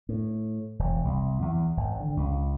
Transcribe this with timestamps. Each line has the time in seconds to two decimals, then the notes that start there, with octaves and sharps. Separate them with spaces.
0.09 A2
0.79 E1
1.05 C2
1.42 E2
1.77 G#1
2.00 D3
2.17 C#2